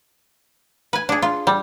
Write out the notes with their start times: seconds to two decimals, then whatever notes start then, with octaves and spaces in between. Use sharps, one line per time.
0.93 B4 G#5
1.09 D4 G#4
1.22 F4
1.47 G3